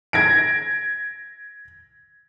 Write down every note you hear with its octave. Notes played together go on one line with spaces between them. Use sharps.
G#6 A#6 D7